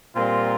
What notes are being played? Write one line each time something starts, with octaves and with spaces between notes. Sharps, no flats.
A#2 G3 C4 F4 A#4